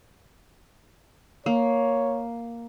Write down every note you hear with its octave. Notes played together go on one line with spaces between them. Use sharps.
A#3 C#5